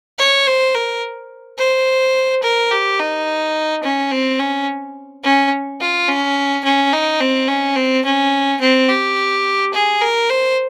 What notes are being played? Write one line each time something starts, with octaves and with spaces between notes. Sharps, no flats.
C#5
C5
A#4
C5
A#4
G4
D#4
C#4
C4
C#4
C#4
F4
C#4
C#4
D#4
C4
C#4
C4
C#4
C4
G4
G#4
A#4
C5